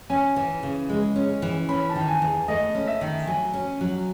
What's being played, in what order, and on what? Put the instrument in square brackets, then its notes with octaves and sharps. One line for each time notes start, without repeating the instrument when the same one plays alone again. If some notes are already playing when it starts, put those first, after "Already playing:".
[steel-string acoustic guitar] C#4 [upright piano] G#5
[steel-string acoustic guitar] E3
C#3
G#3
C#4
E3
[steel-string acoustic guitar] C#4 [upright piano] B5
[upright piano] A5
[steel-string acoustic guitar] D#3
[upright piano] G#5
[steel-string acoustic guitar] E2
[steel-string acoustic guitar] A3 [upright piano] D#5
[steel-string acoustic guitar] C#4
[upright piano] E5
[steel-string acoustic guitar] D#3
[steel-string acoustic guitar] F#3 [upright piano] G#5
[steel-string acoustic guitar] C#4
F#3